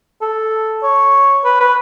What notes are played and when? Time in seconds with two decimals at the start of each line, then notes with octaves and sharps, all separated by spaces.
0.21 A4
0.83 C#5
1.45 B4
1.60 B4